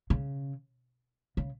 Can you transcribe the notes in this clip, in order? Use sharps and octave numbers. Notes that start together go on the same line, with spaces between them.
C#3
C#3